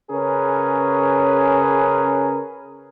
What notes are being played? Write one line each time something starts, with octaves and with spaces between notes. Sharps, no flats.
C#3 C#4 G#4 A#4 B4